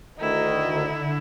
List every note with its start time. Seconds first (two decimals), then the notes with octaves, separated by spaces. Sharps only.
0.21 D2 D#3 D#4 E4 D#5
0.70 D3